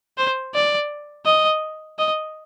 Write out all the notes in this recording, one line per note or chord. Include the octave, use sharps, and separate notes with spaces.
C5
D5
D#5
D#5